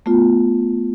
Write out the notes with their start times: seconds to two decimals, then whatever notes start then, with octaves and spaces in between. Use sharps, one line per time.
0.06 A3 B3 F4